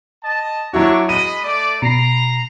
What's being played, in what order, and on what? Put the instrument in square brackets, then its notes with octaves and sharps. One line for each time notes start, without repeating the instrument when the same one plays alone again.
[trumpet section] D#5 A5
[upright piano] F#3 E4 F#4 [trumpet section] D4 C#5 D5
[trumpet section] G#3 D#5 B5 [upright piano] D#7
[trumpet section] A3 D5
[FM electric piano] B2 C7 [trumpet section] A#5